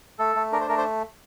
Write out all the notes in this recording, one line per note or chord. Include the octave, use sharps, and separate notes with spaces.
A3 A4
A3
D4 A#4
C5
A3 A#4
C5